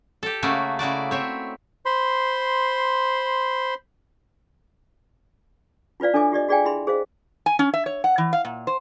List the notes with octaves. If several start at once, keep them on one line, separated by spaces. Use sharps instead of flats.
G4 A4
C#3 A3 A#3 F#4
C#3 E4 F#4 D5
C4 C#5 E5
C5 B5 C6
E4 F4 B4 D5 F5
D4 A4 C#5 E5 G#5 D6
F4 G4 D5 D#5
F#4 G#4 D5 F5 G5 G#5
E4 G#4 E5 B5 C6
G#4 C5 D#5 F5
G#5
C#4
E5
C#5
F#5
E3
F5
A#2
C5